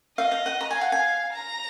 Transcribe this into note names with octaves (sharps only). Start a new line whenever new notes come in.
D#5 F5
F5
F#5
A#5
F5 G#5
F#5
G#5
A#5